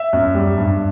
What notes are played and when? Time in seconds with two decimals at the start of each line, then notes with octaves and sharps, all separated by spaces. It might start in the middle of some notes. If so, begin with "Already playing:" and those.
Already playing: E5
0.13 F#2
0.35 G3
0.58 G2